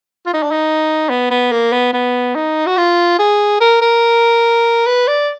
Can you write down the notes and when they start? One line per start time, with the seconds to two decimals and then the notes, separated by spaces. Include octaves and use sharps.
0.26 F4
0.34 D#4
0.43 D4
0.51 D#4
1.09 B3
1.30 B3
1.52 A#3
1.72 B3
1.93 B3
2.35 D#4
2.66 F#4
2.77 F4
3.19 G#4
3.61 A#4
3.82 A#4
4.87 B4
5.07 D5